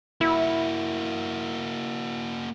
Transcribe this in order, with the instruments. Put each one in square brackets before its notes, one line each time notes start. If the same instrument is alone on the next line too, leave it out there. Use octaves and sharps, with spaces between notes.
[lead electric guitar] A#3 F#4 [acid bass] E4